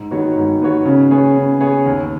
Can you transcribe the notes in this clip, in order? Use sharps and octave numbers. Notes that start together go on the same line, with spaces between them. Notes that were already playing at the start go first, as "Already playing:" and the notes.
Already playing: G#2
D#3 B3 F#4 C#5
G#2
D#3 B3 F#4 C#5
C#3
B3 G#4 C#5
C#3
B3 G#4 C#5
D#2